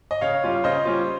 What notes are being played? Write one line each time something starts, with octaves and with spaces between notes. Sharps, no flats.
D#5
C#3 C#5 F5
G3 C#4 F4
C#3 C5 D#5
G3 C#4 F4